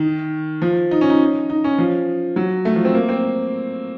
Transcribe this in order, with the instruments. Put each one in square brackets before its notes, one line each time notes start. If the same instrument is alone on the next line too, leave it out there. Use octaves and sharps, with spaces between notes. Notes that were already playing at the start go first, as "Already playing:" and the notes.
Already playing: [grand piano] D#3
F3
D#4
C#4
D#4
D#4
C#4
F3
F#3
A3
F3
C4
A#3
C4